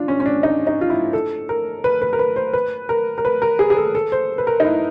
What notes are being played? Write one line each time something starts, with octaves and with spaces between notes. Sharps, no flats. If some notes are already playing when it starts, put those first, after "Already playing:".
Already playing: D4 F4
C#4
C#4
D4
D#4
D#4
F4
E4
A4
A#4
B4
B4
A#4
B4
C5
B4
A#4
A#4
B4
A#4
G#4
G#4
A4
A4
C5
B4
A#4
D#4
E4